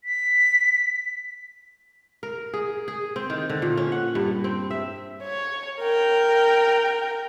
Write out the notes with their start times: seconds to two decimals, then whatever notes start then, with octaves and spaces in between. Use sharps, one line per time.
0.04 B6
2.23 A#4
2.54 G#4
2.88 G#4
3.16 C4
3.30 D#3
3.50 D3
3.62 A#2
3.77 C#4
3.92 F#5
4.15 G2
4.44 C4
4.71 E5
5.23 C#5
5.80 A#4 G5